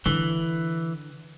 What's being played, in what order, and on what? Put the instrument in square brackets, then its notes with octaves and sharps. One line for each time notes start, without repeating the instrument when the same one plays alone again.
[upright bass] D3 D4 [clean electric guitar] E3